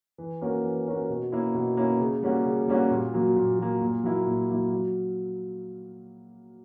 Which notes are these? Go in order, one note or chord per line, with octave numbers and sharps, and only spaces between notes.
E3
A#3 C#4 F#4 A#4
E3
A#3 C#4 F#4 A#4
B2
A#3 C#4 E4
B2
A#3 C#4 E4
C#3
G3 A#3 C#4 F#4
C#3
G3 A#3 C#4 F#4
A#2
F#3 A#3
A#2
F#3 A#3
A#2
F#3 A#3 E4
A#2
F#3 A#3 E4
F#3